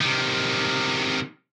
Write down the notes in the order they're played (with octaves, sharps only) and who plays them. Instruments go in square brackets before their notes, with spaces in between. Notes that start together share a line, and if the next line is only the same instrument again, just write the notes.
[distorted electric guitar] C3 D#3